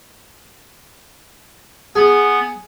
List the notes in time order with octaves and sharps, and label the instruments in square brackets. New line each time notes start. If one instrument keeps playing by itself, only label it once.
[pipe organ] B3 [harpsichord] G#4